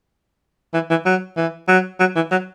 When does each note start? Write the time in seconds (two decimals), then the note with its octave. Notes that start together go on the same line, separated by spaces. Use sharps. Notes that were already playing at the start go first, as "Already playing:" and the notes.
0.74 E3
0.90 E3
1.05 F#3
1.37 E3
1.68 F#3
1.99 F#3
2.15 E3
2.31 F#3